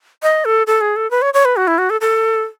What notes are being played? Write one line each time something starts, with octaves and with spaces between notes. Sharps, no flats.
D#5
A4
A4
G#4
A4
B4
C#5
C#5
B4
F#4
E4
F#4
A4
A4